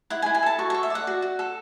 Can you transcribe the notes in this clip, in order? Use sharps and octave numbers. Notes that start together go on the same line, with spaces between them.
E4 F#5
G#5
E4
G#5
A4 A5
F#4 C#6
A4 C#6
E5
D5 F#5
F#4
F#4
A4